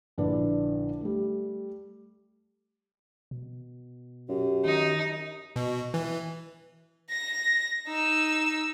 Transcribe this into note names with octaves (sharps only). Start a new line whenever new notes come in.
A#1 D3 D4 E4 B4 D5
G3 A3
B2
F#2 G4
D#3 D#4
B2
E3
A#6
D#4 E6